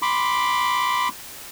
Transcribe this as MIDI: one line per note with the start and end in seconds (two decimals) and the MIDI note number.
0.02 1.08 83
0.02 1.08 84
0.02 1.08 86